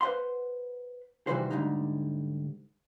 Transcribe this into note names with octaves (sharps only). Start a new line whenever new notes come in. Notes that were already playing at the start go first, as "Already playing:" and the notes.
B4 C5 D#5 F#5 C6
C3 D#3 E3 G3 F#4 C5
D2 G#2 D3 G3 D#4